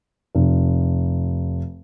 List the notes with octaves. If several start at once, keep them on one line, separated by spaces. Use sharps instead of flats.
F1